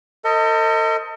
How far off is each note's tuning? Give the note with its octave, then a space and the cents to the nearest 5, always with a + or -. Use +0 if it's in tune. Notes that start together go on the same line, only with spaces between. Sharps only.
A4 +45 C5 +0 D#5 +20